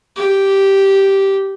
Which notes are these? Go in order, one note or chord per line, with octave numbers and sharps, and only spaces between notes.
G4